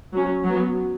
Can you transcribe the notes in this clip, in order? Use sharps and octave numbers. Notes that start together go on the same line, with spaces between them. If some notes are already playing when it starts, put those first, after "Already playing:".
F#3 C#4
F#3 B3